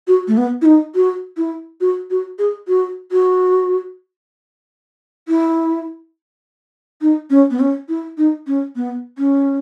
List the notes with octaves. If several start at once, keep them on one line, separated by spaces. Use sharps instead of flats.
F#4
A3
B3
E4
D#4
F#4
E4
F#4
F#4
G#4
F#4
F#4
E4
D#4
C#4
B3
C#4
E4
D#4
C#4
B3
C#4